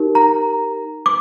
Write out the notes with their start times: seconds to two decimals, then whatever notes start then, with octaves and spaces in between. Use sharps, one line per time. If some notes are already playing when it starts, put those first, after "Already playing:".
Already playing: D#4 G4 A#4
0.15 A#5
1.06 D6